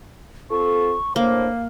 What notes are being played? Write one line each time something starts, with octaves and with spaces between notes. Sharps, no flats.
C4 F4 A4 C#6
A2 A#3 D4 C5 F5